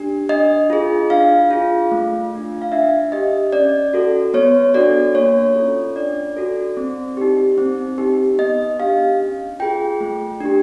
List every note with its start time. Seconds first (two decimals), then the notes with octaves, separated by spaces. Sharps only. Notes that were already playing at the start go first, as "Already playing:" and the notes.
Already playing: D4 G4
0.29 D4 D#5
0.70 F4 G#4
1.10 D4 F5
1.51 F4 G#4
1.91 A3
2.32 D4 F4
2.62 F5
2.72 D4 E5
3.12 G4 D#5
3.53 C#4 D5
3.94 F#4 A4
4.34 B3 C#5
4.74 D4 F#4 A4 D5
5.15 A#3 C#5
5.55 C#4 F4 A4
5.96 D4 D5
6.36 F#4 A4
6.77 C4
7.17 D#4 G4
7.58 C4
7.98 D#4 G4
8.39 B3 D#5
8.79 D4 G4 F5
9.19 C#4
9.60 F4 G#4 G5
10.00 A3
10.41 D4 G4